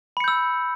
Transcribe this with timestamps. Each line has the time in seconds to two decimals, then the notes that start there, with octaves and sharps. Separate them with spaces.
0.17 B5
0.20 C#7
0.24 G6
0.28 E6